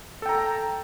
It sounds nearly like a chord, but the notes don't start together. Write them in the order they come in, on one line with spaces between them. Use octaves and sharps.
A4 G5 A#5